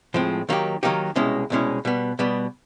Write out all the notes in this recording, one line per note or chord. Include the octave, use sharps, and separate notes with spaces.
A2 F3 G#3 C4
D#3 F#3 A#3 D#4 G4
D#3 F#3 A#3 D#4 G4
C2 B2 G#3 C#4 E4
C2 B2 G#3 C#4 E4
B2 G3 B3
B2 G3 B3